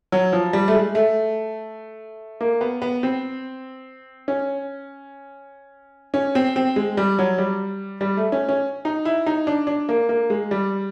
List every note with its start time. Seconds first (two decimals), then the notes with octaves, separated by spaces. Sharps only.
0.12 F#3
0.33 F3
0.53 G3
0.68 A3
0.74 G#3
0.95 A3
2.41 A#3
2.61 B3
2.82 B3
3.03 C4
4.28 C#4
6.14 C#4
6.35 C4
6.56 C4
6.76 G#3
6.97 G3
7.19 F#3
7.38 G3
8.01 G3
8.17 A3
8.32 C#4
8.49 C#4
8.85 D#4
9.05 E4
9.26 D#4
9.47 D4
9.67 D4
9.89 A#3
10.09 A#3
10.30 G#3
10.51 G3